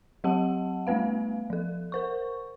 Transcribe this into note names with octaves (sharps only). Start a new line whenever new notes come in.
F#3 G4 F#5 A5
G3 A3 B3 B4 F5
F3 A4
A#4 C5 C#6